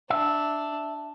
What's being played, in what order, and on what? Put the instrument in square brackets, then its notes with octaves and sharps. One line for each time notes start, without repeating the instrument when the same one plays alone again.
[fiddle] D4 [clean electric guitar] E5